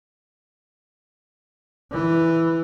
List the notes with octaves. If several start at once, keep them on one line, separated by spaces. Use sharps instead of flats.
E3